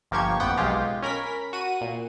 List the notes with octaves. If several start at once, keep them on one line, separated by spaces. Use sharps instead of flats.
G1 F3 A#3 G4 C#6 G#6
A1 F2 B3 F#5 G5
B1 G#3 F4 G4
C#4 A#4 B5 B6
F#4 D#7
A#2